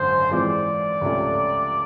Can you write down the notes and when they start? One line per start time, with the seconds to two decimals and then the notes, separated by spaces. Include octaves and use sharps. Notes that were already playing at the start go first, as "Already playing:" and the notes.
Already playing: G#1 F#2 D3 F#3 C5
0.31 E3 G#3 C4 F4 D5
1.01 C#2 C3 F3 A3 C#4